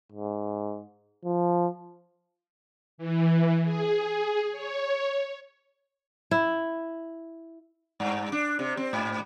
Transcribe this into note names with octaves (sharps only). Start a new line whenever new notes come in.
G#2
F3
E3
G#4
C#5
E4
G2
D4
C3
C4
G#2